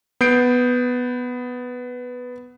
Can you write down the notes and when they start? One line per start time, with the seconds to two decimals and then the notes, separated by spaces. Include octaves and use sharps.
0.21 B3 G6 C7 D7